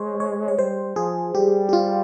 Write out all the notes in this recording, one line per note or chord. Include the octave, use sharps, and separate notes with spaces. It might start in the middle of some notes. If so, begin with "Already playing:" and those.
Already playing: G#3 C5 C#5
C#5
C#5
G3 C5
F3 G#4
G3 G4
G4
F4